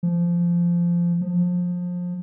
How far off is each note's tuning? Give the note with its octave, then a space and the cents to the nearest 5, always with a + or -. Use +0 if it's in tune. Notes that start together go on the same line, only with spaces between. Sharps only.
F3 -15
F3 +25